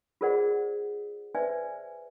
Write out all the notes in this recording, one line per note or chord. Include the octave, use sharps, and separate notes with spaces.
F4 G#4 A#4 C5 D5 F#5
B4 C5 D5 E5 G#5